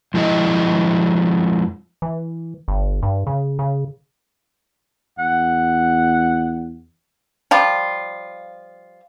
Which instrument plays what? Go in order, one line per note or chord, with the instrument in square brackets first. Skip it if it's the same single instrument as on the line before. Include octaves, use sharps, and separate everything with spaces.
[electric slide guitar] F2 F3 G#3 E4 D#5
[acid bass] E3
G1
G2
C#3
C#3
[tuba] E2 [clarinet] F#5
[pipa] F3 G3 F4